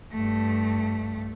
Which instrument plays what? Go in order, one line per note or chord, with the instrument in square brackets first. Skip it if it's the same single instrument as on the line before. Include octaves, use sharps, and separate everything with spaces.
[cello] G2 A3